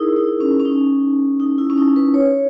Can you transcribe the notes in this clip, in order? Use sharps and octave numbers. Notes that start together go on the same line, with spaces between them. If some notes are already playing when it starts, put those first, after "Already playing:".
Already playing: D#4 E4 G#4 A#4
D#4
C#4
C#4
D#4
D#4
E4
C#4
D#4
B4
C#5